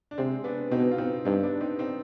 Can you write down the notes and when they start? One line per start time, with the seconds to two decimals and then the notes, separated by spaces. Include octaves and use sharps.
0.11 D4
0.18 C3 G#3 C4
0.44 B3 D4
0.71 B2 C4 D#4
0.91 F4
0.98 C4 D#4
1.25 G2 C4 D#4
1.43 B3 D4
1.61 C4 D#4
1.79 C4 D#4